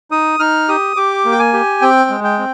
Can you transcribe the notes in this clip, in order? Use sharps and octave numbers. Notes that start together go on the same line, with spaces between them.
D#4 D#6
D#4 F6
G4 D#6
G4 D6
A#3
G5
G#5
G4
C4 G5
G#3
G5
C4